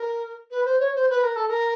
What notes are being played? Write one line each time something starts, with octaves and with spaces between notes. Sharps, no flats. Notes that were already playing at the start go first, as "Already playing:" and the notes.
Already playing: A#4
B4
C5
C#5
C5
B4
A#4
A4
A#4